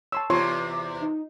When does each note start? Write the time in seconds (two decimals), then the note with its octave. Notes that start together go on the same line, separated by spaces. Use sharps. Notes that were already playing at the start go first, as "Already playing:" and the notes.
0.12 C#5 A5 C6 E6
0.30 E2 C3 F4 C#5 C6 D6
1.02 D#4